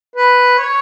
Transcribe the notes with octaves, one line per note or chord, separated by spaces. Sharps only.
B4
C#5